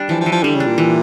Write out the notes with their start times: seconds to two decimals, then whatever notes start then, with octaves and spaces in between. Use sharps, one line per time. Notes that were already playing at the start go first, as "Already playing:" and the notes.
Already playing: G3 D4
0.09 E3 F3
0.21 F3
0.26 E3
0.32 F3
0.43 D3 G3
0.55 C#3
0.60 D4
0.66 A#2
0.78 E3